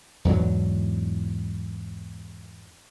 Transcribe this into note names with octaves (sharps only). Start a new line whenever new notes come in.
E2 G#2 B2 F#3